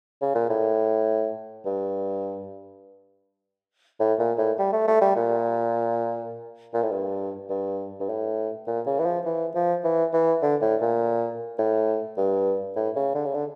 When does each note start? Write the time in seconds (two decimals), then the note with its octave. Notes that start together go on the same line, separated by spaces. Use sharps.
0.21 C#3
0.35 A#2
0.49 A2
1.65 G2
4.00 A2
4.19 A#2
4.38 A2
4.58 G3
4.73 A3
4.88 A3
5.01 G3
5.16 A#2
6.73 A#2
6.82 A2
6.92 G2
7.49 G2
8.00 G2
8.09 A2
8.67 A#2
8.86 C#3
8.99 E3
9.06 F3
9.25 E3
9.55 F3
9.84 E3
10.13 E3
10.42 D3
10.61 A2
10.81 A#2
11.58 A2
12.17 G2
12.76 A2
12.96 C#3
13.15 D3
13.25 C#3
13.34 D3